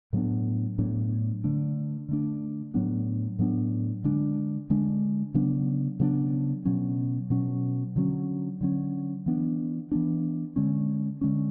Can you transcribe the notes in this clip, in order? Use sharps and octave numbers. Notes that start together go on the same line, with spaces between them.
A2 F#3 B3 D4
A2 F#3 B3 D4
D3 A3 D4
D3 A3 D4
A2 F#3 B3 D4
A2 F#3 B3 D4
D3 G#3 D4
D3 G#3 D4
C#3 F#3 B3 D4
C#3 F#3 B3 D4
B2 F#3 C#4
B2 F#3 C#4
D3 F#3 C#4
D3 F#3 C#4
E3 B3 D4
E3 B3 D4
D3 G#3 C#4
D3 G#3 C#4